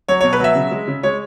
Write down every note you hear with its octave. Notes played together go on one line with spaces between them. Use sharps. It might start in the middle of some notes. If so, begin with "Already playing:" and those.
F#3 C#5
B2 C#5
B4
F#3 E5
C#3
G#3
C#3
G#3 C#5